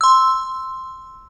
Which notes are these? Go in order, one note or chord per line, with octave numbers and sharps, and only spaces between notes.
C6 E6